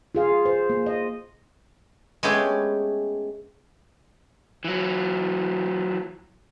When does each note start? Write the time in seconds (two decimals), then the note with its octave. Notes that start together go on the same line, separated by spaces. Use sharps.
0.15 F4 G#4 F5
0.45 C5
0.70 A#3
0.86 D#5
2.23 G#3 A3 B3 C#4 G4 G#4
4.64 E3 F#3